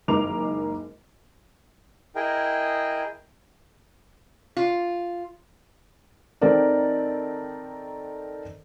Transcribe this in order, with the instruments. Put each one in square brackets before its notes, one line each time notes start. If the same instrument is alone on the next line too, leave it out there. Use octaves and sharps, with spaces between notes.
[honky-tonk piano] F#1 D#3 G#3 A#4 D6 F7
[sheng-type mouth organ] E4 G#4 A#4 D#5 G5
[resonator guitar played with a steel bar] F4
[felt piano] D#3 C4 D#4 A4 A#4 D5